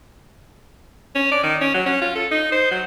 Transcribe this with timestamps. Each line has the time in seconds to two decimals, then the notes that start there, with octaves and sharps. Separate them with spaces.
1.15 C#4
1.32 D5
1.43 D#3
1.61 C#4
1.74 F#3
1.86 C#4
2.01 F4
2.15 A4
2.31 D#4
2.52 C5
2.71 F#3